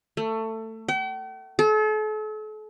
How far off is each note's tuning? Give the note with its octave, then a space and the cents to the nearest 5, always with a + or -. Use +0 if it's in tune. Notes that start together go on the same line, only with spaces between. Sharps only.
A3 +20
G5 -45
A4 -40